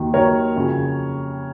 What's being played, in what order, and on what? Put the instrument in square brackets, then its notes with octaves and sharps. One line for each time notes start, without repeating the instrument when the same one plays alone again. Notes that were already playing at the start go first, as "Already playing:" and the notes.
Already playing: [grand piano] D#2 D#3 F#3
D#2 D#3 F#3 A#4 C#5
F2 C#3 F#3